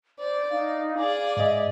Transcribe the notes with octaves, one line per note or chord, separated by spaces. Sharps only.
C5 D5
D#4 F5
G#4 D5 D6
G#2 D#5 E5